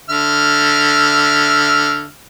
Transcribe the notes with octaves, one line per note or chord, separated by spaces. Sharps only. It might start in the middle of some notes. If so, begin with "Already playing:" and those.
D3 E5 F6